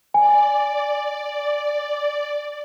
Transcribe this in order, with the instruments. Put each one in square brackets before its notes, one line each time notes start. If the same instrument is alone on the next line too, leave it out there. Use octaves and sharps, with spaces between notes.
[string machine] D5 [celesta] G#5